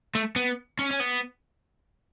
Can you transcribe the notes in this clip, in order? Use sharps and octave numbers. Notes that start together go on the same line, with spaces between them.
A3
B3
C#4
C#4
B3